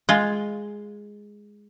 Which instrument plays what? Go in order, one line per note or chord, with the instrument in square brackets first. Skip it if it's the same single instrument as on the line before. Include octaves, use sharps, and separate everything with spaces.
[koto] G#3 F4